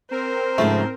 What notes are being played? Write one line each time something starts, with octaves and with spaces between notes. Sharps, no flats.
C4 A#4 C5
G#2 C#3 F3 A3